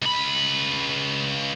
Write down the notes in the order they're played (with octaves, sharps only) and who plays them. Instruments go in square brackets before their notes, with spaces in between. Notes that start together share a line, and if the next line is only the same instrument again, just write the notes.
[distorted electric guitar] C#2 B5